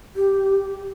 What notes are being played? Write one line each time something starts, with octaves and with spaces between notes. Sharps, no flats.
G4